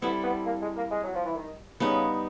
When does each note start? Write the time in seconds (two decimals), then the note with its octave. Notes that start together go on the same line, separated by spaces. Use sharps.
0.02 G3 B3 C4 E4 A4
0.24 B3
0.46 A#3
0.61 G#3
0.77 A#3
0.91 G#3
1.04 F#3
1.15 F3
1.25 E3
1.35 D#3
1.80 C#3 G3 B3 D#4